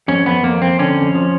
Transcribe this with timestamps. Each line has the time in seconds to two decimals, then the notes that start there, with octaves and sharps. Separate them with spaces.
0.08 F2 C#4
0.26 F2 B3
0.43 F2 A#3
0.61 F2 C4
0.79 D3 C#4
0.97 F2
1.15 F3